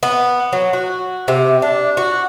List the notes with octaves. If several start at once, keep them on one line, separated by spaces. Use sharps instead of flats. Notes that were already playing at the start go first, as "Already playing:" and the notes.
B3
F#3
F#4
C3
D4
F#4